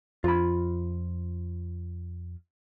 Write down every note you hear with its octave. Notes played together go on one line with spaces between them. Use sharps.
F2 F4 B5